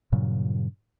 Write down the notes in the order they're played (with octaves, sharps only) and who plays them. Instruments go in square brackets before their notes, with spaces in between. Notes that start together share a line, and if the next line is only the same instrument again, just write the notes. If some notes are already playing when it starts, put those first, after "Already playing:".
[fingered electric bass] G2 A#2 C#3 F#3